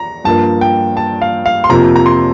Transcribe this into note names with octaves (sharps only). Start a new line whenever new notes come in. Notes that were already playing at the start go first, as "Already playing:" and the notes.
Already playing: A#5
G2 F3 A#3 A5
G5
A5
F5
F5
C6
F2 C3 F3 A#3 A#5
A#5
C6